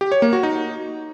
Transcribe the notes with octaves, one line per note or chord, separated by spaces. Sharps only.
G4
C#5
A#3
F#4
D#4